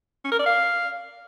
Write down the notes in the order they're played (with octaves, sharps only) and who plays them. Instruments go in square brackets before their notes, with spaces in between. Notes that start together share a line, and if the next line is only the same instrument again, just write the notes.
[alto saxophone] C#4
A#4
D5
F5